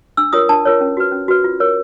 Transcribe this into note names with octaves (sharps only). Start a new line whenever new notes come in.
D4 E6
F4 A#4 C#5 D#6
D4 A5
F4 A#4 C#5
C#4
F#4 B4
C#4
F#4 B4
F4
A#4 C#5